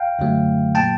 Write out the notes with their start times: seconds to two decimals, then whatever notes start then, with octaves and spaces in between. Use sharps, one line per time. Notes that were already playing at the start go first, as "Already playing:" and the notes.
Already playing: F5 G5
0.19 F#2 D3 F#3 A3
0.75 A#2 F#3 A#3 G5 A5